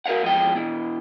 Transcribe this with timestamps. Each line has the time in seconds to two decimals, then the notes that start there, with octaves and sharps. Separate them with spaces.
0.06 F#4 A#4 C#5 F5 F#5
0.22 E2 F3 G#3 G5
0.55 B2 E3